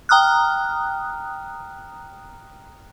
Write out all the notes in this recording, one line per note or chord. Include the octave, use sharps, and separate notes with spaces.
G5 A#5 D#6 F6 F#6